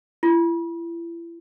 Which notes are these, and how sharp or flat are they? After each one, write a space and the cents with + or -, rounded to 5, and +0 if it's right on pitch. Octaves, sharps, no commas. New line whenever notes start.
E4 +35